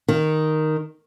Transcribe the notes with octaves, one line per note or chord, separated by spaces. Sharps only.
D#3